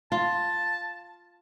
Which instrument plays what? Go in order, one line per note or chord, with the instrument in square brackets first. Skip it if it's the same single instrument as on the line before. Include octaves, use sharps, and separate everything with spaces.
[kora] F4 [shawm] A5